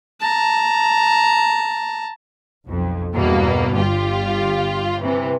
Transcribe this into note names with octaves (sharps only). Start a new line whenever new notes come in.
A5 A#5
B1 F2
E2 G2 B2 A#3
G1 F4 G4
C3 E3